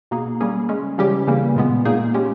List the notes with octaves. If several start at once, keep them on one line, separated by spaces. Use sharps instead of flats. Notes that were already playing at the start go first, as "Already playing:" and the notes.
B2 A#3 D#4 G#4
G3 A#3 C#4 G#4
C#3 G#3 C#4
C#3 E3 G3 C#4 G4
C#3 E3 G3 A#3
A#2 G#3 B3
A#2 A#3 D#4 G#4
G#3 C#4 G4